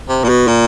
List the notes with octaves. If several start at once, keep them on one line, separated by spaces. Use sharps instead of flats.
C3
A#2
B2
A#2